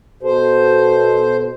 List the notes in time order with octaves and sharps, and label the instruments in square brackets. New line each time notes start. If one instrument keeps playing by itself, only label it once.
[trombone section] B2 A4 [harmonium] C5